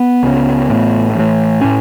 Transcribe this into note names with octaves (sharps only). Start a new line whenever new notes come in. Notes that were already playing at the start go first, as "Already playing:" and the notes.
Already playing: B3
C#2 C#3
A1 A2
A1 A2
A2 C#4